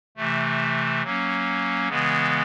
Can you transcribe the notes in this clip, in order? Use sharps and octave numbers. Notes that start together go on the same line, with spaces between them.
C3 E3 A3
F#3 A#3 C#4
C#3 E3 G#3 B3